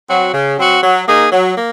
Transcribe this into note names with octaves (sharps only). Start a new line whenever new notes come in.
F#3 C4 F#4
C#3
F#3 C4 F#4
F#3
A#3 D#4 G#4
F#3
A#3